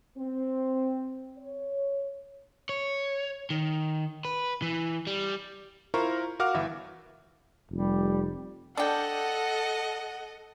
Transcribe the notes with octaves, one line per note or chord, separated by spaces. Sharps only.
C4
C#5
C#5
D#3
B4
E3
G3
E4 F4 A#4 C5 A#5 C#6
F#4 A#4 F5 F#5 D6 F6
G1 E3 E5
F1 G3
D4 A4 D#5 F#5 G5